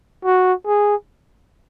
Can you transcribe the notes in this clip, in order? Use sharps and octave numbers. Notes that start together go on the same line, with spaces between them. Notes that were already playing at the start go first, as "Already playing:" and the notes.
F#4
G#4